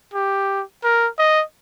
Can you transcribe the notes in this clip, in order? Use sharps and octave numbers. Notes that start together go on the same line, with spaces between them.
G4
A#4
D#5